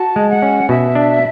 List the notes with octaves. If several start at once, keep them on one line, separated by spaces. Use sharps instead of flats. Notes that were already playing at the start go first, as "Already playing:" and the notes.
Already playing: F#4 A5
G#3
F#5
C#4
B2 E5
D4